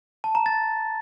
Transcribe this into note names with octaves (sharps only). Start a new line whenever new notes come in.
A5
A#5
A6